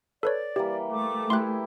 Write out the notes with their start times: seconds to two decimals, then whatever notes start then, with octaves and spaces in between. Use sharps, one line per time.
0.23 A4 B4 C#5 D5
0.56 E3 G3 A#3 G4
0.92 A3 D6
1.30 E4 G4 G#4 C6 F#6